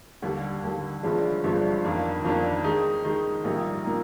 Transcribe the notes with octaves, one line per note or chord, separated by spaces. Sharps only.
D#2 D3 G3
D#2 D3 G3
G1 G2 F3 G#3 D4
G1 G2 F3 G#3 D4
F2 D#3 A#3 D4
F2 D#3 A#3 D4
D#3 G#3 D#4
D#3 G#3 D#4
A#1 A#2 G3 A#3 D#4
A#2 G3 A#3 D#4